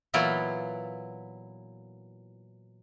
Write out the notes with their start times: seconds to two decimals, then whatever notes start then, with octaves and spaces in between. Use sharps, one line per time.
0.14 A#2 E3 F#3 B3 E4 F4